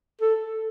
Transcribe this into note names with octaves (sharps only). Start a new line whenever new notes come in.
A4